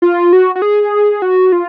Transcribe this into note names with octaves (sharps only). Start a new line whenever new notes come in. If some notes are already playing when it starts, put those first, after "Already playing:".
F4
F#4
F#4
G#4
F#4
F4